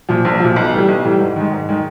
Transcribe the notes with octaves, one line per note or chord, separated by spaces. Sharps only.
A#2 F3
A#1
A#2 F3
B1
A2 E3 G3
B1
A2 E3 G3
G#2
D#3 G#3
G#2
D#3 G#3